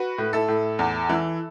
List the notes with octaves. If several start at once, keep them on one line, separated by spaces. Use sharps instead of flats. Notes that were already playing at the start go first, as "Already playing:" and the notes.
Already playing: F#4 B4
A2
E4 A4
A2
E2
E3